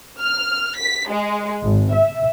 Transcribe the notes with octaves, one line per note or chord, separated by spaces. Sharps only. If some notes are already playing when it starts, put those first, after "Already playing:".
F6
B6
G#3
G#1
E5